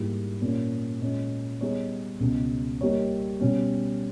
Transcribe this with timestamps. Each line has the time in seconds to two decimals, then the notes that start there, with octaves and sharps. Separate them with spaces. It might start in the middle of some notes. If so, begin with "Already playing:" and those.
Already playing: G#2 G3 A#3 E4 G4
0.41 A#2 A#3 C#4
1.01 A#2 G#3 C#4
1.61 G3 B3 D#4 G#4 C#5
2.20 C#2 B2 G#3
2.81 G3 A#3 D#4 G4 C#5
3.40 B2 G3 C#4